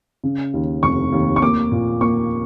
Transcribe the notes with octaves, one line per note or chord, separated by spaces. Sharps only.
C#3
D#2
F1 C#6
D#2
C#6
A#3 D6
A#2
A#3 C#6